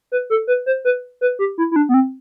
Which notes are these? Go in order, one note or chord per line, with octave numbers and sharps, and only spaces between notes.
B4
A4
B4
C5
B4
B4
G4
E4
E4
D4
B3
C4